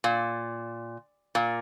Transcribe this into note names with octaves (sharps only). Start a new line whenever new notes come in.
A#2
A#2